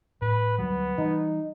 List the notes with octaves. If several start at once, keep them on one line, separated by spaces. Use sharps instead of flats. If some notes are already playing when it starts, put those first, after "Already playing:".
A2 B4
D2 F#3 G3 B3
E3 G3 D#4